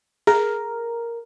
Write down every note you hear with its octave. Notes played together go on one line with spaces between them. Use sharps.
G#4 A#4